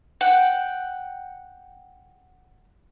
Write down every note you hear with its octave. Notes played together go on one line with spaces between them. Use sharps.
F#5 G5